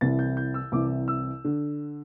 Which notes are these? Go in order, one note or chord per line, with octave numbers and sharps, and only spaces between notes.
C2 C3 E3 A6
G6
G6
E6
C2 C3 E3 D6
E6
D3